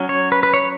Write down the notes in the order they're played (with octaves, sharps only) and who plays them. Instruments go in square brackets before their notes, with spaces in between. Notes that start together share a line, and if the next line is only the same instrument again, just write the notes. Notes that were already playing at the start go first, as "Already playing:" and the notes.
Already playing: [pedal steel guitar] F#3 C#4
C#5
B4
B4
C#5